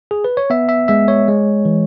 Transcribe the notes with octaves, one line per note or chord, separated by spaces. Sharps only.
G#4
B4
C#5
B3 E5
E5
G#3 E5
C#5
G#3
E3